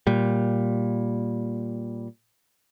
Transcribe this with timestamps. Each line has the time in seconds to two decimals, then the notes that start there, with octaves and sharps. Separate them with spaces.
0.07 A#2 G3